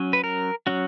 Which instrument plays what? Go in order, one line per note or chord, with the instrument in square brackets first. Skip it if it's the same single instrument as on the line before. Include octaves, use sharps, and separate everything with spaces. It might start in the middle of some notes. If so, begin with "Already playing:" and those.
Already playing: [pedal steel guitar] F#3 C#4
B4
A#4
F#3 C#4 F#4